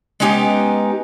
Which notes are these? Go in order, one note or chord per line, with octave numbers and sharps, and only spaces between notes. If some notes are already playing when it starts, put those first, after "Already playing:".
G#3 B3 C#4 D#4 G4